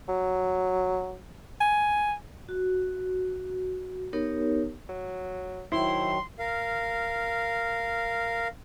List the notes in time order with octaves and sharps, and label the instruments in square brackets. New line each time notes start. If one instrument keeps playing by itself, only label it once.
[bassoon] F#3
[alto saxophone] G#5
[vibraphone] F#4
B3 D#4 G4 A#4 C#5
[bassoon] F#3
[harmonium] D#3 F#3 [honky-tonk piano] E4 [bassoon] C5 [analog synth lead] C6
[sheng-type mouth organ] A#4 F5